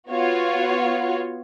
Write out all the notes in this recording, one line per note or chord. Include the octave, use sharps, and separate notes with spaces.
B3 F4 F#4 C#5